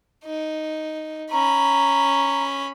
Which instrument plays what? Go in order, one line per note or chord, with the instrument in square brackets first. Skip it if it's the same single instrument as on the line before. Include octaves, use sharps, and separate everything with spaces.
[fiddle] D#4
[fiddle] C#4 B5 [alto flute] A#5